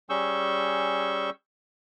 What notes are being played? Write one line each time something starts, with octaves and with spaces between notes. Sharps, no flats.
G3 C#4 G#4 C#6 E6 G6